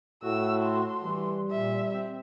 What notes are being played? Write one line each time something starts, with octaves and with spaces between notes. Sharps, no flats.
A2 F#4 E6
C6
E3 G3
A#2 E5
C4